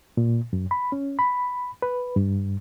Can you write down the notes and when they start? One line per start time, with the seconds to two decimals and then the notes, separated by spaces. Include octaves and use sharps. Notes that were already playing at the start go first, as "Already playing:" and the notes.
0.17 A#2
0.53 F#2
0.71 B5
0.92 C#4
1.19 B5
1.82 B4
2.16 G2